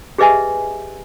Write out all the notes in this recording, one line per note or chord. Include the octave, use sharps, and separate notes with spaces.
G4 G#4 B4 D#5 E5 G#5